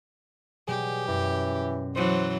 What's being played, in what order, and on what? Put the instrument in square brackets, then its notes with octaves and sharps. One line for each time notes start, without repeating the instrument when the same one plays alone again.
[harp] B2 F#3 G3 [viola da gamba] G4 [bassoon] G#4
[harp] F#2 [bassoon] E3
[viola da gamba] E3 F#3 [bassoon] C5